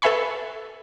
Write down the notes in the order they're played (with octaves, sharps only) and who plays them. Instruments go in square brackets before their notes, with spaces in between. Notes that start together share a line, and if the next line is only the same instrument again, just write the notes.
[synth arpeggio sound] A4 B4 E5 G#5 B5 C#6